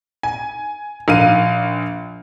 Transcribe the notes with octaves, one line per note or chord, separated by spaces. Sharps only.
G#5
A#1 F5 D#7